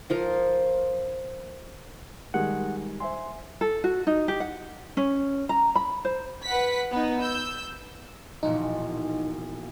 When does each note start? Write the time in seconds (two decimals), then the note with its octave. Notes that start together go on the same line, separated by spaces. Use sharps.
0.10 F3 F4 A#4
2.34 D#3 G3 G#3 F#5
3.00 C5 E5 G#5 C6
3.61 A4
3.84 F#4
4.07 D#4
4.28 G4
4.40 F#5
4.97 C#4
5.49 A#5
5.75 B5
6.05 C5
6.45 B4 F#5 B6
6.91 B3 D#4
7.20 E6 G6
8.43 E1 A#1 A#2 D#4